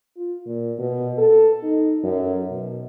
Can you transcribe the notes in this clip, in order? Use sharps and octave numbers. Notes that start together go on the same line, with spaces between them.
F4
A#2
B2
A4
D#4
F#2
B2